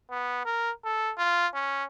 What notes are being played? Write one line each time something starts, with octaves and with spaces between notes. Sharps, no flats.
B3
A#4
A4
F4
C#4